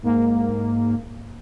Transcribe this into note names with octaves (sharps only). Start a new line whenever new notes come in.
G#2 A#3